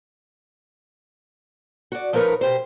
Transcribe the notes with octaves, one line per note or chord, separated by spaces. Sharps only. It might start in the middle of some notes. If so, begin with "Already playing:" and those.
F#4 D5
F3 A3 D#4 A#4 B4 C#5
B2 G4 C5